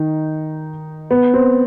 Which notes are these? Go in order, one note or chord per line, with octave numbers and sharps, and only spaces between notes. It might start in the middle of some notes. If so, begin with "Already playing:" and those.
Already playing: D#3 D#4
B3
C4